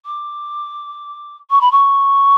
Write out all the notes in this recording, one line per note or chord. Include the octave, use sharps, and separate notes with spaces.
D6
C#6
B5
C#6